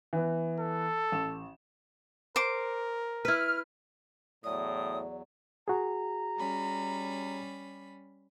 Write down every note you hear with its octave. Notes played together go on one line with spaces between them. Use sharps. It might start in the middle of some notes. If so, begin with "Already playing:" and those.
E3 B3
A4
A1 E7
A#4 C5 D6
E4 B4 F6
E2 A2 F#3 D5 D#6
F#4 G#4 A#5
G3 C#4 B5